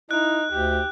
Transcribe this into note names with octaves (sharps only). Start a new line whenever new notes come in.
D#4 E4 F#6
D2 G4